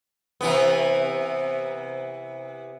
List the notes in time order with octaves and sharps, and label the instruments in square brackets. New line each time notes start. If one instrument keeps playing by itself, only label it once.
[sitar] C3 E3 B3